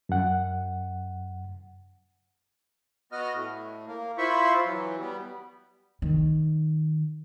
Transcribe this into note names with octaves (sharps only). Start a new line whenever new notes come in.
F#2 F#5
B3 F#4 D#5 F6
A2
A#3
E4 F4 C5 E5 B5 C#6
E3 F#3
G3 B3
D#3